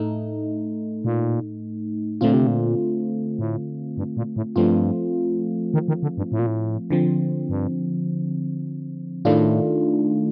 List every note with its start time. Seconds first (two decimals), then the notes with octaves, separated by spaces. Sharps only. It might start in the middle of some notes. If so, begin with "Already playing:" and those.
Already playing: A2 A3 D#4
1.04 A#2
2.21 A#2 D3 A3 C4 F4
2.34 C3
2.47 A#2
3.39 A2
3.97 G2
4.17 A#2
4.36 A2
4.56 G2 F3 A3 C4 F4
5.74 D#3
5.88 D#3
6.03 D3
6.18 G2
6.32 A2
6.39 A#2
6.47 A2
6.90 D3 F3 C4
7.49 G2
9.25 A2 D#3 A3 D4 F4